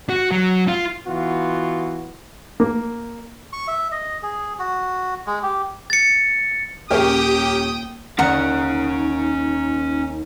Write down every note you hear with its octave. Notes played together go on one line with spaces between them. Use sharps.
F#4
F#3
F4
E3 B3 F4 F#4
A#3
C#6
E5
D#5
G#4
F#4
G#3
G4
A6 C#7
D#1 C#4 G4 G#4 A#4 C#5 G5 D#6
D#2 C#4 D#4 A#4 F5 F#5